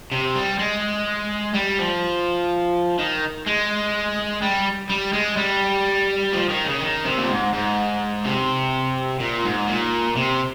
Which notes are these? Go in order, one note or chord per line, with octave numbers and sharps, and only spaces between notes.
C3
G3
G#3
G3
F3
D#3
G#3
G3
G3
G#3
G3
F3
D#3
C#3
D#3
C3
A#2
G#2
G#2
C3
A#2
G#2
A#2
C3